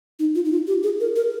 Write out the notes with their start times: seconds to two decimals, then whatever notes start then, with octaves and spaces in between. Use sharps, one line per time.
0.19 D#4
0.35 F4
0.45 D#4
0.52 F4
0.67 G4
0.83 G#4
1.00 A#4
1.16 A#4